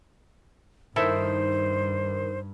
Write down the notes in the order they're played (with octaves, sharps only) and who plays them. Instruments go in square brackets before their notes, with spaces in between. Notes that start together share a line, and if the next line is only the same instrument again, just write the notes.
[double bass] G2 [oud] D#3 [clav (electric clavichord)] E4 A4 E5 [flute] C5